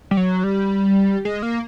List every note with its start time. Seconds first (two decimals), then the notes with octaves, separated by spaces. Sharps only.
0.11 G3
0.17 F#3
0.44 G3
1.25 G#3
1.42 A#3